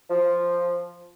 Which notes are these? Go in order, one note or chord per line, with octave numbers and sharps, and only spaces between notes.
F3